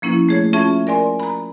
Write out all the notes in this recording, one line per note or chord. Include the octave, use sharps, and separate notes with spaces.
F3 A#3 C#4 E4
A3 G#4 C#5
C#4 F4 G#4 E5 A5 C#6
A#4 D5 G#5 C6
A#5 B5